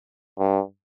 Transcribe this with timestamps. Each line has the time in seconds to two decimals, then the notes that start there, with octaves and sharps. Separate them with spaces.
0.38 G2